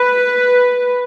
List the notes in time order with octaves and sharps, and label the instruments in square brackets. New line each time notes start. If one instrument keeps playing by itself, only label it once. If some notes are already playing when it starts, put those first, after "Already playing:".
Already playing: [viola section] B4